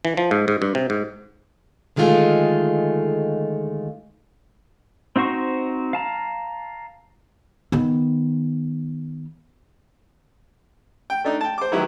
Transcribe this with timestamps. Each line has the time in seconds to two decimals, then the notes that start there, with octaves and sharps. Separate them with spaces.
0.05 E3
0.17 F3
0.31 G#2
0.48 G#2
0.62 G2
0.75 C3
0.90 G#2
1.96 D3 D#3 G#3 A3 F4 G#4
5.16 C4 D#4 F#4 C5 C#6
5.93 F5 A5 A#5
7.72 D#3 B3
11.10 G5
11.24 A3 D4 D#4
11.41 G5 A5
11.58 C5 D6
11.72 D#3 F#3 E4 G4 B4